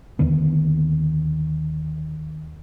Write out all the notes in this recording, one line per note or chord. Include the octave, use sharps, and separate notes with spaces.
D#2 D3 D#3 B3